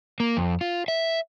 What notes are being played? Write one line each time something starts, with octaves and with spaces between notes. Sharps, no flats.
A#3
F2
F4
E5